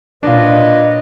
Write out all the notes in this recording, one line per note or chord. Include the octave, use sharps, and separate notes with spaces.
A#2 D4 F4 B4 C#5 D#5